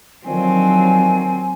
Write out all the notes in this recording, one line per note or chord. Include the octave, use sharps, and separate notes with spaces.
D3 D#3 F3 F#3 C4 G#5